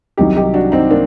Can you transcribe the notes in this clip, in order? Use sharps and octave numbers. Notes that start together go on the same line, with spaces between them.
C2 C3 D#3 F#3 D#4 G4
D#4 G4
D4 F#4
C4 D#4
A#3 D4